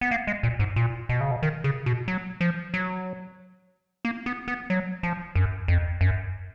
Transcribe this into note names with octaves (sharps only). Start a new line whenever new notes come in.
B3
A#3
G#3
A#2
G#2
A#2
B2
C#3
B2
D#3
C#3
B2
F#3
F3
F#3
A#3
B3
B3
F#3
F3
F#2
F2
F#2